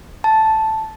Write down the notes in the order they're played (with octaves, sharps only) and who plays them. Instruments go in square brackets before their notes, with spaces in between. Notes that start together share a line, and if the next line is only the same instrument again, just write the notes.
[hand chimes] A5